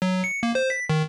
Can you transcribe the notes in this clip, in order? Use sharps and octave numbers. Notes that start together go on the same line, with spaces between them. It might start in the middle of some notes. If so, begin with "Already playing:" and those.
F#3
C#7
A#3
C5
B6
D#3